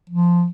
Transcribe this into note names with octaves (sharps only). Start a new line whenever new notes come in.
F3